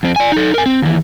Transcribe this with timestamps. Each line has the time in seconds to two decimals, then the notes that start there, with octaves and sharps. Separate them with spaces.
0.03 F2 C4
0.16 D5 G#5
0.32 D#4 A4
0.54 A#4 G#5
0.66 C4
0.82 D#2 E3